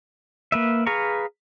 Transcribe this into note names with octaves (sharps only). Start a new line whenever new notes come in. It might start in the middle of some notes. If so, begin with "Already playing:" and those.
A#3 B4 E5
G#4 B4 F5 A#5 C#6